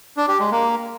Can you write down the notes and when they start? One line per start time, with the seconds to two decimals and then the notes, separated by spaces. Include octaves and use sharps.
0.17 D4
0.28 G4
0.40 G#3
0.51 A#3